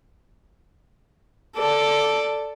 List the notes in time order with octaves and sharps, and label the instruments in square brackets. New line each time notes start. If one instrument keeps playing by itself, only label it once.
[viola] A4 D5